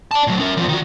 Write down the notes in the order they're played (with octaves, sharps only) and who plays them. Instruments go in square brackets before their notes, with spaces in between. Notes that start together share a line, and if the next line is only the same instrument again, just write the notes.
[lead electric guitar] D5 A5
A2 F#3
C#4 A#4
E2 F3
D#3 F#4